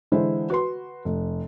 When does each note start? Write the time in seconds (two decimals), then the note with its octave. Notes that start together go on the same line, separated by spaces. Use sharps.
0.12 D3 E3 G#3 E4 C5
0.50 F#4 B4 C6
1.05 F1